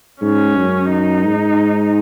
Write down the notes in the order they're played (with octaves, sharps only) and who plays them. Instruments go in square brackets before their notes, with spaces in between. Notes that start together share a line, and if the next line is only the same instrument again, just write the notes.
[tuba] G#2 [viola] C#4
[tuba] F#2
[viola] D#4
[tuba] G#2